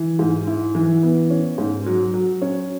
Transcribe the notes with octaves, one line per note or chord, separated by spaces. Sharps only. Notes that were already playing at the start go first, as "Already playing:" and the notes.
Already playing: E3
G#2
E4
E3
B3
C#4
G#2
F#3
F#3
C#4